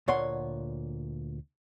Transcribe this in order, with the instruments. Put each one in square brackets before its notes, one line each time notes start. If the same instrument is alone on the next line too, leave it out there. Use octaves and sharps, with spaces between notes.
[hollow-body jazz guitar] D2 A#2 C#5 F#5 C6